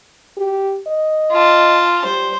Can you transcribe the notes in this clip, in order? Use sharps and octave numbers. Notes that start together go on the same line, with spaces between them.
G4
D#5
F4 A5
G3 C5